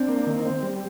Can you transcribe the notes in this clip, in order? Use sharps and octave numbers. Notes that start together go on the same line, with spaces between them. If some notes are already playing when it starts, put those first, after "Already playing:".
Already playing: C4 D4
A#3
D#3
C4
G3